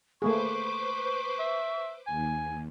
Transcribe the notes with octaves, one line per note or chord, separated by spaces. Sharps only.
A3 A#3 G#4 B4 C5 C#6 D6
E5
D#2 G#5